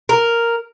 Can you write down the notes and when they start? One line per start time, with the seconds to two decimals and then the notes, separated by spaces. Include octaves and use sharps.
0.09 A#4